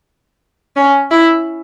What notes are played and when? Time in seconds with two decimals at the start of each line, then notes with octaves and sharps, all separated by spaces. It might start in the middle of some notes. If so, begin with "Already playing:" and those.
0.76 C#4
1.11 E4